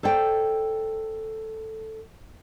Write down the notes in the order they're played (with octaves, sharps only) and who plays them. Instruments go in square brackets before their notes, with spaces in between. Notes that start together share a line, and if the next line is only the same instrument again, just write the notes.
[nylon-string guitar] A4 C5 D5 G5